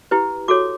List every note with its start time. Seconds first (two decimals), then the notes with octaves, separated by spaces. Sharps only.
0.11 E4 G4 B4
0.48 F#4 A4 C#5 D6